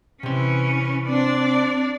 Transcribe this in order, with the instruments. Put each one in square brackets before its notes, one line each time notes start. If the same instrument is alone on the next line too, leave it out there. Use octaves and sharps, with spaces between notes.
[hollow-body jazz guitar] C3 C6 [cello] E3 C#4
[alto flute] C4 [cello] D4 D5